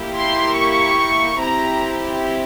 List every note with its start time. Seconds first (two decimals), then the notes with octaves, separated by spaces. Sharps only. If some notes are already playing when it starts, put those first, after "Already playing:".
Already playing: A#3 E4 G4
0.16 C6
0.57 C#6
1.39 C4 E4 G4 A#5